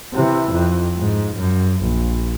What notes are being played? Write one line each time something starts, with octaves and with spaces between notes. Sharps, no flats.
C3 E3
F2
G#2
F#2
A#1